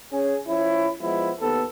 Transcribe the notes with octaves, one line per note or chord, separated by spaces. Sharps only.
C#4 G#4
F3 C#4 E4
F3 G#3 B3 E4
D#2 B3 A4